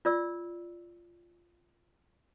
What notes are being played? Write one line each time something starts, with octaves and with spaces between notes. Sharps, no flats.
F4 D5 E6